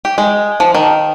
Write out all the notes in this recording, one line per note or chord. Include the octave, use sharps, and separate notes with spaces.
G4
G#3
F3
D#3